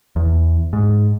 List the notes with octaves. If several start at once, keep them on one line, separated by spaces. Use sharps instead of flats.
E2
G#2